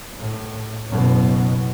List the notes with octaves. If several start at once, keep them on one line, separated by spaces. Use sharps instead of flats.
A2
F#1 B2